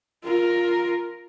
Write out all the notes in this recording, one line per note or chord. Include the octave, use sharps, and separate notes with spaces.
F4 A#4